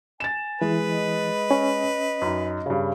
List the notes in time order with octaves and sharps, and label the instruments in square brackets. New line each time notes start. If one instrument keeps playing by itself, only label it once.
[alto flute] G#5 [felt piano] A6 E7
[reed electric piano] E3 [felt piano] G#3 [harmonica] B4
[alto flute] D#5
[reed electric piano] C#4
[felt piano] F#2 D#4
G2 C#3